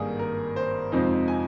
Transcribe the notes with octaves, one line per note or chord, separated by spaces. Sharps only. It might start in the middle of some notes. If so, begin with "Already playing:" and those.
Already playing: G#1 G2 D#3 G3 A#3 G#4
A#4
C5
F2 C3 F3 G#3 D#4 C5
G#5